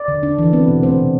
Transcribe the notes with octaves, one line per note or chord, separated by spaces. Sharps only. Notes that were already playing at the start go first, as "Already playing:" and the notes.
Already playing: D5
D3
D4
E3 A4
B3 C4 B4
B2
A3 C4 C5
C3